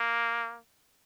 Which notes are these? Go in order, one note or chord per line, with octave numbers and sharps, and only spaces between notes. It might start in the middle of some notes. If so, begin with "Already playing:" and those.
Already playing: A#3